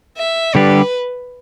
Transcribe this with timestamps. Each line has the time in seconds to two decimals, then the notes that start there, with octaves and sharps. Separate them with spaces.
0.18 E5
0.55 D3 G3 D4 G4 B4